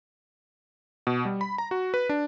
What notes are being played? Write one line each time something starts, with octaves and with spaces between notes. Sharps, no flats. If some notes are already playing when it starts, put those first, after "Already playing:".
B2
G3
B5
A#5
F#4
B4
D4